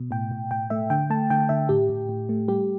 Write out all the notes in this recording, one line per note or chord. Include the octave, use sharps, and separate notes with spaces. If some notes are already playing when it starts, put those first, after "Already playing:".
Already playing: B2
A2 G5
A2
A2 G5
A3 E5
D3 G5
A3 A5
D3 G5
D3 E5
A2 G4
A2
A2
A3
G3 G4